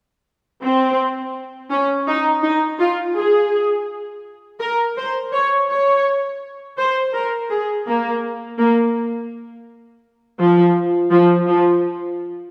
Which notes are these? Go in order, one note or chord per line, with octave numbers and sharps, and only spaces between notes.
C4
C#4
D#4
D#4
F4
G#4
A#4
C5
C#5
C#5
C5
A#4
G#4
A#3
A#3
F3
F3
F3